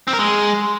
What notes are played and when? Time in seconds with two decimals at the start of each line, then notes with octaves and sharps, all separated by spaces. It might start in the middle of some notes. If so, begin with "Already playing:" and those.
0.08 C4
0.13 A#4
0.19 G#3